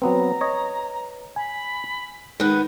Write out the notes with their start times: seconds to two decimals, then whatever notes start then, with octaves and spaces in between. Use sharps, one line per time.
0.02 F#3 B3 C4 B4 A#5
0.41 C#5 D#5
1.36 G#5 B5
2.40 D#3 G#3 B3 F#6